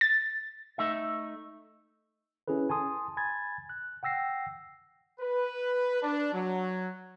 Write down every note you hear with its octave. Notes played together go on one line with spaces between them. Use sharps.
A6
A3 D#4 E5
C#4 E4 G#4 A4 B4
G#5 A5 C6 D#6
G#5 B5 G#6 A6
F#6
F#5 G5 E6 A#6 C7
B4
D4
F#3